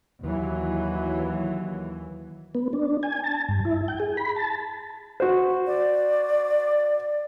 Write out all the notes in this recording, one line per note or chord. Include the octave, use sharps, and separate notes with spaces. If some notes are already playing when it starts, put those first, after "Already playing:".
D#2 E3 F#3
B3
D4
G#5
A5
G2
E4
G5
G#4
B5
A5
F#4 C5
D5